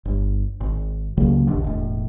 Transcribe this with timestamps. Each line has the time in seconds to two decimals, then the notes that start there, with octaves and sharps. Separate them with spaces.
0.05 G1
0.61 G#1
1.17 C#2 C#3 F#3 A#3
1.47 F1 A#1 D#2 D3
1.64 E1 A2